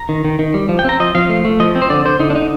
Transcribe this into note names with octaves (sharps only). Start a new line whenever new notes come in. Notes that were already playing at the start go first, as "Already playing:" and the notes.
Already playing: A#5
D#3
D#3
D#3
G3
F3
G5
C4 A#5
F3 D#5
F3 F5
A3
A3
F3 D#5
C4
C5
D3 D5
D3 C5
D3 D#4
D4
D3 D#4